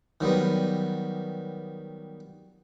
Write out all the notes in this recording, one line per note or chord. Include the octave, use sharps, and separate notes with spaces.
D#3 F#3 G3 B3